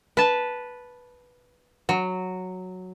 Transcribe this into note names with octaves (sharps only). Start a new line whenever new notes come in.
B4 A5
F#3